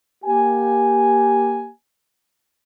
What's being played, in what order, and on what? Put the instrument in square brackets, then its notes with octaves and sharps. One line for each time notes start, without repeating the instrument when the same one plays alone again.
[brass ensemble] A#3 G4 G#5